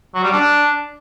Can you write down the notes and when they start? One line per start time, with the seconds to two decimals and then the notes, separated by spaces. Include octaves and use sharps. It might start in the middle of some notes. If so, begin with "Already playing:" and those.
0.15 F#3
0.24 G3
0.33 D4